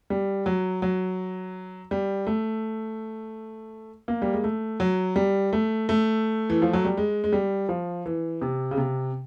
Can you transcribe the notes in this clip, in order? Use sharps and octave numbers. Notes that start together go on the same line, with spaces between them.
G3
F#3
F#3
G3
A3
A#3
G3
G#3
A3
F#3
G3
A3
A3
E3
F3
F#3
G3
G#3
G#3
G3
F3
E3
C3
C#3
C3